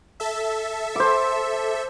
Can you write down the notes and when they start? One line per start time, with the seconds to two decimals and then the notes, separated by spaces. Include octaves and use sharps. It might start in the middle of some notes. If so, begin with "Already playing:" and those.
0.20 A4 E5
0.96 C5 D6